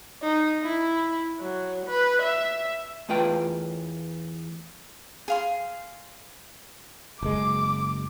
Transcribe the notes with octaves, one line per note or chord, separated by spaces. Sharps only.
D#4
E4
F#3
B4
E5
E2 A3 F4 B4 G5
G#4 F5 C6
F#1 G#3 D6